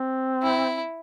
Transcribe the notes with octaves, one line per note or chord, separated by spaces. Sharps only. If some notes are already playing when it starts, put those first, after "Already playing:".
Already playing: C4
E4